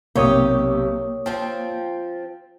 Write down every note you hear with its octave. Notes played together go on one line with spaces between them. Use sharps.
B1 C3 A#3 G4 C#5 D#6
F3 C4 G5